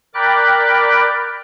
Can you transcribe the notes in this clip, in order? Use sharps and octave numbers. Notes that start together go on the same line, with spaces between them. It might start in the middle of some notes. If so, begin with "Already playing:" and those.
A#4 D5 G5 B5 D6 F#6